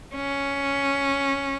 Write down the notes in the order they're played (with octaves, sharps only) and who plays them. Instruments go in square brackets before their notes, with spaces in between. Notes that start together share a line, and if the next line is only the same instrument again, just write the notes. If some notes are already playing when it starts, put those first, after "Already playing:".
[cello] C#4